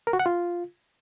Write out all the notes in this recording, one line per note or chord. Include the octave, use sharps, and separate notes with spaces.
A#4
F#4
F#5
F4